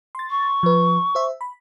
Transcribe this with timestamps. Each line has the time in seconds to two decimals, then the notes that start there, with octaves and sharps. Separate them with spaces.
0.15 C6 A6
0.31 C#6
0.63 F3 B4
1.15 C5 E5
1.41 B5